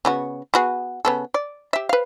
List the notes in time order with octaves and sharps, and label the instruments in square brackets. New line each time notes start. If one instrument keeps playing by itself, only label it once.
[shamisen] C#3 B3 F#4
B3 F#4 G#4
C#3 B3 A4
D5
G4 E5
B4 F5